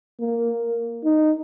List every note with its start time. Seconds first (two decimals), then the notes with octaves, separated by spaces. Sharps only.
0.20 A#3
1.04 D#4